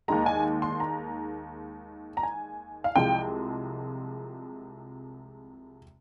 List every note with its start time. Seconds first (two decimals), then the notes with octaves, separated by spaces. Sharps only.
0.08 D#2 D#3 G#3 A#5
0.26 G#5
0.62 C6
0.80 A#5
2.17 A#5
2.23 G#5
2.84 F5
2.96 C2 C3 F3 G#3 G5